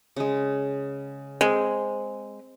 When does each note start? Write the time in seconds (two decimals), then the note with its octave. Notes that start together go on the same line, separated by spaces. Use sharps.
0.16 C#3 G#3
1.41 G#3 C4